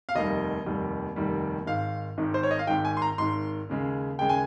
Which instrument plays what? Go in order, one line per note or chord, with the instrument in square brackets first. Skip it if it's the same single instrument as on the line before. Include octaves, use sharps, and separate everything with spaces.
[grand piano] F5
F1 D#2 D#3 G3 D#5
F1 D#2 D#3 G3
F1 D#2 D#3 G3
G#1 G#2 D#3 F5
G#1 G#2 D#3
C5
C#5
D#5
F5
G#1 G#2 D#3 G5
G#5
C6
A#5
G#1 G#2 D#3 C6
D#2 C#3 G#3
D#2 C#3 G#3 G5
G#5